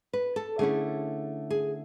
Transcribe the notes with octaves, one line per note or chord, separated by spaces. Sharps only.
B4
A4
D3 A3 C#4 E4 G#4
G#4